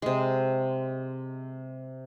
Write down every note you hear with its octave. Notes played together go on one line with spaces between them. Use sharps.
C3 G#3